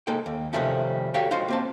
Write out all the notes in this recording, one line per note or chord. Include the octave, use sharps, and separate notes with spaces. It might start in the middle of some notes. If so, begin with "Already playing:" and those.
G#3 A#3 D#4 A4 G5
D#2
C3 D#3 F3 G3 A3 C#4
F#4 G4 A4 C#5 F5 G5
G#3 F4 F#4 C5 F5
A#3 C4 A5